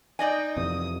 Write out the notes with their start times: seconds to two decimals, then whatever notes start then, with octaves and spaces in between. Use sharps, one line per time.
0.19 D#4 D5 D#5 G5 G#5
0.57 F2 C3 E3 D#6